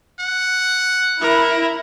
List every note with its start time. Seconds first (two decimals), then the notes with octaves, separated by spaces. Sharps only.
0.20 F#5
1.21 E4 A#4